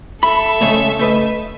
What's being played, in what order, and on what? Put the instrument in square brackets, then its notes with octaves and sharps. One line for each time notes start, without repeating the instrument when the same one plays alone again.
[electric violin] A4 E5 [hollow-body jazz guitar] B5
[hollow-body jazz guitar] C#3 G#3 A3
A3 B4 D#5